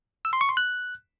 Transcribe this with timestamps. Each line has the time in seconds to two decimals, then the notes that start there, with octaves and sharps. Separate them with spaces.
0.25 E6
0.33 C6
0.41 C#6
0.49 C6
0.57 F#6